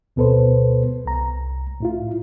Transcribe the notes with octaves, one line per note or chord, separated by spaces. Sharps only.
D2 B2 B3 A4 B4 C5
C2 A#5
A2 E4 F4